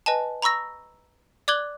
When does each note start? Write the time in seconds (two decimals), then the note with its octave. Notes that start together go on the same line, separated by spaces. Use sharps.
0.06 B4 D#5 G#5 A5
0.42 A#5 B5 C#6 E6 A#6
1.48 D5 D6 F#6 G#6 F#7 G7